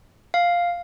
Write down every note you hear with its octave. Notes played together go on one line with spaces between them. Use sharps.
F5